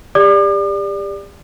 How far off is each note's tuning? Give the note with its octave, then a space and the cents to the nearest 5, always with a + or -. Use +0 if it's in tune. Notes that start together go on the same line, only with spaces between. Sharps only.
G4 +35 D5 +0 D6 +45